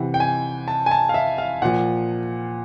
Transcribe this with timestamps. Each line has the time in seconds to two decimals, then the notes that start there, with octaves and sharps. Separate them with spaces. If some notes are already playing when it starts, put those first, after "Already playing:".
Already playing: C3 E3 F#5
0.14 G5
0.20 G#5
0.68 A5
0.86 G#5
0.91 A5
1.09 F5
1.14 E5
1.38 F5
1.62 A#2 F3 F#5